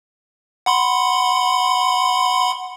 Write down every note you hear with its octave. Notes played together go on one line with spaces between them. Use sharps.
F#5 B5 C6